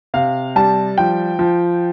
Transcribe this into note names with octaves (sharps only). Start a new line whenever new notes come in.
C3 F5
G3 A5
F3 G5
F3